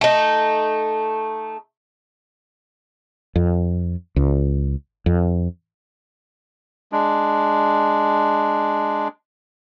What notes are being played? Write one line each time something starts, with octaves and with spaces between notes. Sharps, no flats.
A3 D#4
F2
C#2
F2
G#3 D4